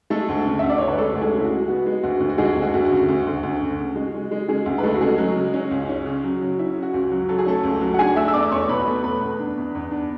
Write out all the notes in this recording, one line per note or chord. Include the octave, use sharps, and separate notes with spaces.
G#3 A3 A4
D2
C#3
D2 E5
D5
D2 C#5
B4
G#3 A3 A4
D2
G#3 G#4
C#3
E4
F#4
G#3
B3 F#4
G#3
D2 F#4
D2
F#4
D2 G#3 G#4
D2
F#4
D2
F#4
C#3
D2
D2
D2
C#3
C#3
G#3
G#3
G#3
C#3 G#3 G#4
D2
B4
G#3 A3 A4
F#4
C#3 G#3 G#4
F#3
C#3
C#4
C#2
C#4
C#3
F#3
F#3
C#4 E4
C#3
F#4
C#2
F#3
F#3 A4
G#4
A3 C#4 A4
C#2
F#3
F#5
D4 G#4 G#5
A3 E5 E6
E6
E2 D5 D6
E2 C#5 C#6
B2 B4 B5
A3
E2 B4 B5
E2
D4
E2
E2
D4